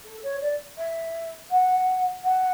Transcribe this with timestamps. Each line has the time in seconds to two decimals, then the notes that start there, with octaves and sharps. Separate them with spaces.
0.04 A4
0.23 C#5
0.41 D5
0.78 E5
1.50 F#5
2.24 F#5